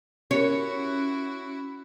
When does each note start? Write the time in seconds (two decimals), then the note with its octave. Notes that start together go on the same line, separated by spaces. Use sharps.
0.31 C#4 E4 F#4 G4 A#4 C#5